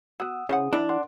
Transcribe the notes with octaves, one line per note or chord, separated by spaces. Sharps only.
B3 F#4 F#5 D#6 E6
C#3 E4 G#4 C5 F#5 D#6
E3 D4
A#4 D5 F#5 C6